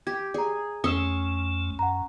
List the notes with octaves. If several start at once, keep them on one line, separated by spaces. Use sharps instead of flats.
G4 G#6
G#4 D5 A#5
F2 A3 C#4 C6 C#6 D#6 E6 E7
F#2 F#5 A#5